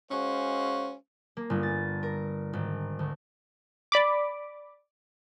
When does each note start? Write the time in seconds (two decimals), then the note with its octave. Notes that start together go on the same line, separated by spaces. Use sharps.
0.11 G#3 C#4 F#4 C5 F5
1.37 A#3
1.50 G1
1.63 A6
2.03 A#4
2.53 G#1
2.99 D2
3.92 D5 B5 D6